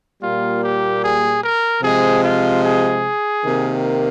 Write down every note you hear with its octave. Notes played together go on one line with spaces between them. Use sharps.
A#2 G3 A#3 F4
G4
G#4
A#4
C3 F3 G#3 G#4
F4
G#4
C3 D#3 A#3